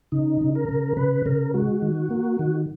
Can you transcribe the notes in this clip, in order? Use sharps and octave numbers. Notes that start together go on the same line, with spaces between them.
C#3 D#4
C#3
A#4
C#3
C#3 B4
C#3 A#4
G#3 F#4
D#3
A#3
D#3